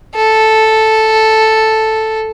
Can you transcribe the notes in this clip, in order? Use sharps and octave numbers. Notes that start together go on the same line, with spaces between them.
A4